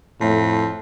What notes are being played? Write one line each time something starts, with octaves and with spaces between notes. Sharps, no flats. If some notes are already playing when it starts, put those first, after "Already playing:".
F2 A2